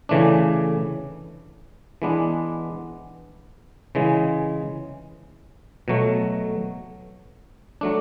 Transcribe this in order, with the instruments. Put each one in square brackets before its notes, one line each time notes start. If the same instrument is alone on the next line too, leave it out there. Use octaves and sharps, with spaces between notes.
[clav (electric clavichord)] C#3 E3 A3 D4
E3 G#3 B3 D4
C#3 E3 G#3
B2 F#3 A3
F#3 A3 D4